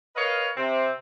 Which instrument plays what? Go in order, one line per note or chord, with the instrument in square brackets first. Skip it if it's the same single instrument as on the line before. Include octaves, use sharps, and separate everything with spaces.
[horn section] A#4 B4 C#5 D#5 F5
C3 C4